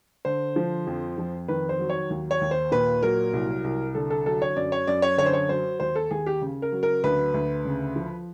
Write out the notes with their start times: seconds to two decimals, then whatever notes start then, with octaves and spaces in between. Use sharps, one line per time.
0.25 D3 C5
0.56 F3
0.87 F2
1.18 F2
1.48 D#3 B4
1.69 C5
1.79 F#3
1.90 C#5
2.10 D#2
2.31 C#5
2.41 D#2
2.51 C5
2.71 A#2 B4
3.03 F#3 A#4
3.33 C2
3.64 C2
3.95 D3 A4
4.10 A4
4.26 F#3 A4
4.42 C#5
4.56 F#2 D5
4.72 C#5
4.87 F#2 D5
5.02 C#5
5.18 D3 C#5
5.26 C5
5.33 C#5
5.49 F#3 C5
5.80 D#2 C5
5.95 A4
6.11 D#2 G#4
6.26 G4
6.42 C#3
6.62 A#4
6.72 F#3
6.83 A#4
7.04 D2 B4
7.34 D2
7.65 C#3
7.96 F3